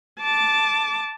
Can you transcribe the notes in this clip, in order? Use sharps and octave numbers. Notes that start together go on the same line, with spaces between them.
A5 D6